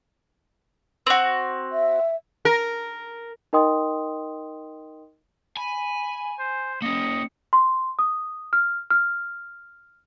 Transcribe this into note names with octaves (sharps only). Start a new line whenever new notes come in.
C4 F#4
E5
A#4
D#4 A#4 D#5 G5 C6 D#6
G#5 B5
C5
A#3 C#4 D#5 C#7
C6
D#6
F6
F6